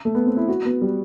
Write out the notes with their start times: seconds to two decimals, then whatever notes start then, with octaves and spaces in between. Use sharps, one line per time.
0.05 A3
0.15 B3
0.26 C4
0.37 E4
0.48 F#4
0.65 B3
0.82 G3